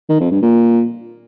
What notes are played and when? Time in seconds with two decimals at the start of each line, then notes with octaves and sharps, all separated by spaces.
0.09 D#3
0.20 F2
0.31 G2
0.42 A#2